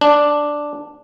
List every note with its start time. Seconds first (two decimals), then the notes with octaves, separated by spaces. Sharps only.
0.01 D4